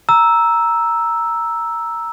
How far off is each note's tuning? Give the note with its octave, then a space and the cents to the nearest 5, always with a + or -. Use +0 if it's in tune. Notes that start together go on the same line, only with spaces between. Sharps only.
A#5 +0 E6 +0